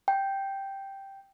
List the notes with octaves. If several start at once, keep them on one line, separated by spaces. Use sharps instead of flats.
G5